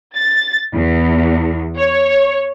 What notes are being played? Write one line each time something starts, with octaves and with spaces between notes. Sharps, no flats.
A6
E2
C#5